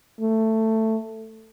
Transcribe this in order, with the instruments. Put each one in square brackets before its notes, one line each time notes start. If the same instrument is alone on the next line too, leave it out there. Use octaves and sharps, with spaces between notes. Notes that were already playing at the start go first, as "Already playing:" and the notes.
[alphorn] A3